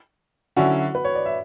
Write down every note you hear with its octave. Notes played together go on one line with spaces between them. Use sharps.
D3 F#3 C#4 E4 F#4 F#5
B4
C#5
D5
E5